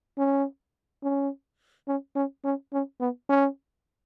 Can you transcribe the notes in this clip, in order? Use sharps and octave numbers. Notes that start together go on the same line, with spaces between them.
C#4
C#4
C#4
C#4
C#4
C#4
B3
C#4